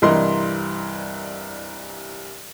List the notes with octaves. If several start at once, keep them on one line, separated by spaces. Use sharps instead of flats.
C2 G2 E3 A#4 D#5 C6